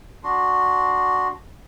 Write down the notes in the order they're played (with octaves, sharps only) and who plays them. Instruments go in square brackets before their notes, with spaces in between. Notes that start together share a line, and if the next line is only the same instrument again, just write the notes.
[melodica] D4 F#4 C6